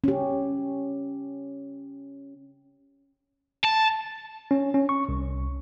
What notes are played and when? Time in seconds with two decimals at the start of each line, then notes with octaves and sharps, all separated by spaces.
0.04 C#4 G4
3.64 A5
4.51 C#4
4.74 C#4
4.89 C#6
5.09 C2